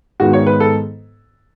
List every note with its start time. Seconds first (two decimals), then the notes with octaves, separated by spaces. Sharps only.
0.20 G#2 D#3 G#3 B3 F#4
0.33 C#5
0.47 B4
0.60 A4